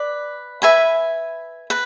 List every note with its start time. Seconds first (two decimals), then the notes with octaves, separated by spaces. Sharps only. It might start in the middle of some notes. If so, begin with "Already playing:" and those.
Already playing: B4 D5
0.62 B4 E5 G#5 B5
1.70 B4